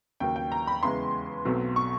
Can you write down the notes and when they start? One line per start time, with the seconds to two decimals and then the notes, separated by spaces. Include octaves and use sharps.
0.20 D#2 C#3 F#3 A#3 G5
0.36 G5
0.52 A#5
0.67 B5
0.82 E2 C#3 E3 G#3 B3 C6
1.45 B1 B2 F#3 A3 C4
1.76 C#6